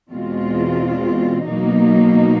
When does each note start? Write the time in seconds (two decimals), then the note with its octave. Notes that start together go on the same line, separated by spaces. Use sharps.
0.11 E2 B2 G#3 C4 F4
1.47 B2 F#3 A#3 D#4